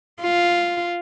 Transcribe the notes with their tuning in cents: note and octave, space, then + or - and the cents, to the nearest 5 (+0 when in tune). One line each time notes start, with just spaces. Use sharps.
F4 +0